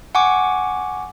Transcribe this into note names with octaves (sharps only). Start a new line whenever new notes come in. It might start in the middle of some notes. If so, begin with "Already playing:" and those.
F#5 G#5 C#6 D6